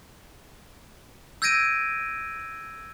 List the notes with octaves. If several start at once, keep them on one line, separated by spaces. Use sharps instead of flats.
E6 G6 G#6 A#6 D7 D#7